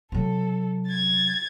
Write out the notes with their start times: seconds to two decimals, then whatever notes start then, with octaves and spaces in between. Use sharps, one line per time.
0.12 C3 F#3 A4
0.88 G#6 A6